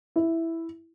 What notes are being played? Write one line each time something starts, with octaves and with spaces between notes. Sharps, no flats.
E4